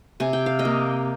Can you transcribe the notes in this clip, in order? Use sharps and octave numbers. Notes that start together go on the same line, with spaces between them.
C3 G#5
G5
F5
D#5 G5
A#3